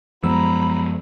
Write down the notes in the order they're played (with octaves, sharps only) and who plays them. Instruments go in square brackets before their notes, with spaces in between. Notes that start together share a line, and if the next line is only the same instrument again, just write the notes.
[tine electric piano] F#2 G#3 E6 [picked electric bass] F3 B3 [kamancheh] A#5 B5